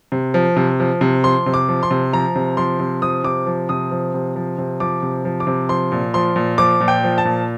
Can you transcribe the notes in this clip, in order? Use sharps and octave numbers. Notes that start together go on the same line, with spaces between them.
C3
F3
C3
F3
C3
F3 C6
C3
D6
F3
C6
C3
F3 A#5
C3
F3 C6
C3
F3 D#6
C3 D6
F3
C3 D#6
F3
C3
F3
C3
F3 D6
C3
F3
D6
C3
F3 C6
A#2
F3 C6
A#2
F3 D6
A#2
G5
F3
A5
A#2